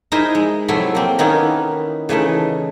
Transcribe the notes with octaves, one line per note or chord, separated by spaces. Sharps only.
D#4 E4 G#4 A#4 C5 E5
G#3
C3 F#3 A3 E4 C6
A#3 C4
D#3 A#3 B3 C#4 D#4 E4
C#3 E3 A3 D#4